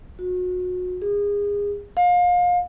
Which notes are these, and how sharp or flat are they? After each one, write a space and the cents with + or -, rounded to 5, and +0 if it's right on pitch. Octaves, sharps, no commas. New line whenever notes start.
F#4 -30
G#4 -30
F5 +30